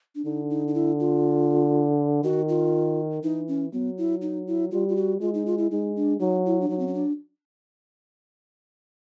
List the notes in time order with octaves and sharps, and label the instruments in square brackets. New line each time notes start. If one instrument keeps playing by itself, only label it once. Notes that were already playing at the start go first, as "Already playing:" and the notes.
[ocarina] D4
[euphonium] D3 [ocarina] D#4
[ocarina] D#4
D#4
E4
F4
[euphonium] D#3 [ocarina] F#4
[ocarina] F4
[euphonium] E3 [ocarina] D#4
[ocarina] C#4
[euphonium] F#3 [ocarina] B3
[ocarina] E4
D#4
E4
[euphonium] G3 [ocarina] F4
[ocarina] F4
F#4
[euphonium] G#3 [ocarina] F4
[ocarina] D#4
F4
E4
[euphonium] G#3 [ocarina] D#4
[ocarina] D4
[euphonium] F#3 [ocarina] D#4
[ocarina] E4
D4
[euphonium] F#3 [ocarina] D#4
[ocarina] C4
C#4
D4